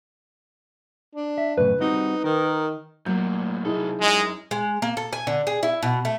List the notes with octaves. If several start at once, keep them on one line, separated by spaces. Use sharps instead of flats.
D4
E5
F#2 A2 C#3 B4
G3 C4 D#4 F#4
D#3 A#4
A2 F#3 A#3 G6
C2 D#4 E4 G#4 A4
F#2 G#3
G#3
A#3
A4
G#5
D3
G#4
E4
B2
A3